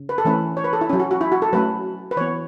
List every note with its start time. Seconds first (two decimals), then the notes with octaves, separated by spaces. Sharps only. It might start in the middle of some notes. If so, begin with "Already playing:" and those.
Already playing: C#3
0.09 B4
0.18 A4
0.25 E3 A3 C#4 B4
0.57 C#5
0.64 B4
0.73 A4
0.81 E4
0.89 F#3 C#4
1.00 F#4
1.11 F#4
1.21 E4
1.32 F#4
1.42 A4
1.53 F#3 A3 C#4 B4
2.11 B4
2.17 E3 B3 C#5